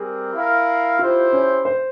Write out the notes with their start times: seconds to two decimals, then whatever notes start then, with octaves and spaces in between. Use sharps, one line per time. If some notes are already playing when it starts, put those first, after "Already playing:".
Already playing: G3 C4 G4 G#4 A#4
0.35 E4 A#4 F5
0.99 E4 F4 G4 C5
1.33 C#4
1.65 C5